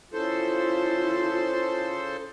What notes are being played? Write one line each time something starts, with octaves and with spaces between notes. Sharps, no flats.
C#3 E4 F4 A4 C5